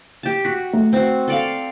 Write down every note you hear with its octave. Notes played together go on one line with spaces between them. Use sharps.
G4 A5
F#4 B6
A3
C4 F#4
A4 D5 F5